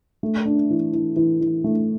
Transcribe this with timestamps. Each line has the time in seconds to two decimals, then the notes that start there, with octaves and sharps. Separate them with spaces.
0.23 A3
0.45 D4
0.70 E3
0.93 E3
1.16 E3
1.41 E3
1.64 A3